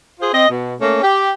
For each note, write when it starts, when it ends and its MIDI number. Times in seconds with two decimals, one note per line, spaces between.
0.20 0.32 65
0.20 0.32 68
0.20 0.32 72
0.33 0.49 60
0.33 0.49 75
0.49 0.74 47
0.80 0.98 57
0.80 0.98 58
0.80 0.98 61
1.02 1.29 67